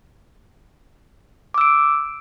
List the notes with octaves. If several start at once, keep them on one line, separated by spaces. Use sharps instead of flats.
D6 E6 D7